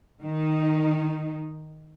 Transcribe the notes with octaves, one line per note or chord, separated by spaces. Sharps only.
D#3 D#4